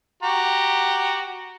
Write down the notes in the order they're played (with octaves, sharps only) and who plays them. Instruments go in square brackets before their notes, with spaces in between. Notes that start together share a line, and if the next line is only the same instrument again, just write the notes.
[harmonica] F#4 G4 A#5